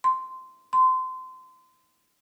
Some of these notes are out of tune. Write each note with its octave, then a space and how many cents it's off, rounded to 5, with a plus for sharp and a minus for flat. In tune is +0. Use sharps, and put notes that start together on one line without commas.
C6 -10
C6 -25